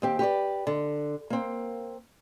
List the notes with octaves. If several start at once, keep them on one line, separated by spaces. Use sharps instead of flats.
D#2 C4 G4
G4 B4 C#5 D5
D3
A#3 C4